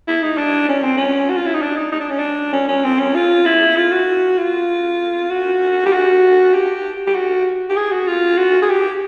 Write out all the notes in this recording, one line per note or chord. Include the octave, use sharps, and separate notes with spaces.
E4
D#4
D4
C#4
C4
C#4
F#4
F4
E4
D#4
D4
D#4
D#4
D4
C#4
D4
C#4
C#4
C4
C#4
F4
E4
F4
F#4
F4
F#4
G4
F#4
G4
G4
F#4
G4
G#4
F#4
F4
F#4
G#4
G4